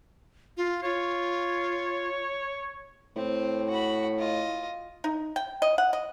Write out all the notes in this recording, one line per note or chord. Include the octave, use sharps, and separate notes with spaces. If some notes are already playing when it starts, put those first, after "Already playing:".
F4
F4 C#5
A2 C4
F#4 B5
F4 D#5
D#4
G5
D#5
F#5
D#5